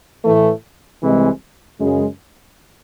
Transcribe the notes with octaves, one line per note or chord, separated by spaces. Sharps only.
A2 E3 A3
C2 C3 E3 G#3
F#2 C#3 G#3